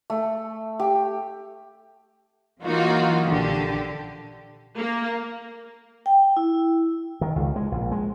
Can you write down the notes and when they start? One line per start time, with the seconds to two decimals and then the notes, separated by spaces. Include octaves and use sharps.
0.10 A3
0.79 G4
2.64 E3 F#3 A#3 D#4 F4 F#4
3.27 A#1 D3 G4
4.76 A#3
6.06 G5
6.37 E4
7.21 D#3
7.36 C#2
7.56 G#3
7.72 A#1
7.92 G#3